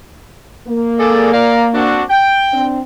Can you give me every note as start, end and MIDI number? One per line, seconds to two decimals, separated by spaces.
0.67 2.04 58
0.99 1.30 68
0.99 1.30 69
0.99 1.30 74
1.33 1.66 74
1.33 1.66 77
1.33 1.66 82
1.73 2.04 60
1.73 2.04 62
1.73 2.04 66
2.10 2.64 79
2.53 2.80 60
2.53 2.80 62